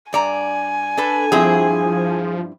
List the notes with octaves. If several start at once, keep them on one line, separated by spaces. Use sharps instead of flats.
G2 D5 G#5 A#5
D4 A4 B4
G2 F3 C4 E4 G#4